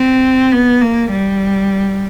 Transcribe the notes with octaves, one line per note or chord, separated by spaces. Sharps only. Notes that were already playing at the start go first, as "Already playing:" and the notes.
Already playing: C4
B3
A#3
G3